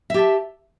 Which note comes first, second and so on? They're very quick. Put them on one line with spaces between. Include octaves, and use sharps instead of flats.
E5 G4 A5